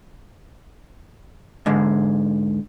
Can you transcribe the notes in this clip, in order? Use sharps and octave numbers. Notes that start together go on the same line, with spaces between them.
G#2 D3 G#3